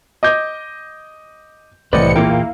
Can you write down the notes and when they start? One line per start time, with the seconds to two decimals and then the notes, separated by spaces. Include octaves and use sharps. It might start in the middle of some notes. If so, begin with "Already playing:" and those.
0.23 D#5 D6 G6
1.93 C2 A2 E3 B4 C5 D5 D#5 C#7
2.16 E2 A#2 A#3 E4 F4 G5